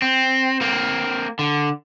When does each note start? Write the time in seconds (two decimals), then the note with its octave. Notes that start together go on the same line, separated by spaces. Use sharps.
0.02 C4
0.61 A#3 C4
1.39 D3